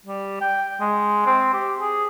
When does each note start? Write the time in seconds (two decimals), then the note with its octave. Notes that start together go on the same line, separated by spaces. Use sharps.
0.06 G3
0.41 G5
0.80 G#3
1.26 C4
1.54 G4
1.80 G#4